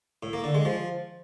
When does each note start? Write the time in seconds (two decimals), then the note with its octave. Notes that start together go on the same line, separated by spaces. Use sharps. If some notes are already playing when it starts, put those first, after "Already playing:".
0.23 A2
0.33 A#3
0.44 D3
0.55 G#3
0.65 F3